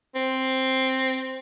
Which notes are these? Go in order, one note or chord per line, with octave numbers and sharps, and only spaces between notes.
C4